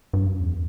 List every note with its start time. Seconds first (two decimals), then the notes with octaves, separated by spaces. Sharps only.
0.13 G2
0.26 F#2
0.40 E2